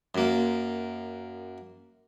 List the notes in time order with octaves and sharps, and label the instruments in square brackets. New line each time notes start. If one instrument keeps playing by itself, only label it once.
[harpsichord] F#2 A#3